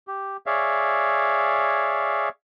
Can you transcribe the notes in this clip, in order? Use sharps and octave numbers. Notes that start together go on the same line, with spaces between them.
G4
G#4 C#5 D5 E5 F5